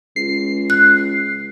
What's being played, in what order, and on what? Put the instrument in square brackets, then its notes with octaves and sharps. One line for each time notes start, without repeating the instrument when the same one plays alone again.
[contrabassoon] C#2 [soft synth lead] C7
[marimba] F#6